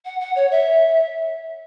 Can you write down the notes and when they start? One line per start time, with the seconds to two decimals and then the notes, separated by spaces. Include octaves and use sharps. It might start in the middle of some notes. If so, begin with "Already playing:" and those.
0.05 F#5
0.20 F#5
0.35 C#5
0.51 E5